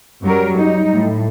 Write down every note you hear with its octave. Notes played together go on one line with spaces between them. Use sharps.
F#2 F#3 G3 A#4
G3 D#4
A2